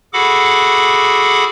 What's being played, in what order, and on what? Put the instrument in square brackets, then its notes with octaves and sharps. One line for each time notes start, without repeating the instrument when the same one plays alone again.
[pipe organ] F#4 G#4 A4 F#5 B5 D6